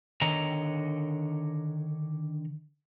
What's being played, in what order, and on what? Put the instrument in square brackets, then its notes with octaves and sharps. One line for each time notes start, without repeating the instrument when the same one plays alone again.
[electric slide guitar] D3 D#3 C#5 D#5 A#5